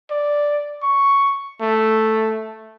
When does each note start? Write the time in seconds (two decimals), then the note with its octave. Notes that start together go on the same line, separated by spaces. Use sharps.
0.10 D5
0.83 C#6
1.61 A3